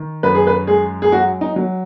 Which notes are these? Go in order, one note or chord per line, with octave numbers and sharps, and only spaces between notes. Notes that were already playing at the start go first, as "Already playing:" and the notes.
Already playing: D#3
F#2 B4
G#4
B4
G#3 G#4
G#4
F#3 F#4
D#4
F#3